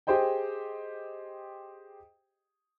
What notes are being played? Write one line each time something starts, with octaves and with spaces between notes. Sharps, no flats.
G4 G#4 C5 D#5 G5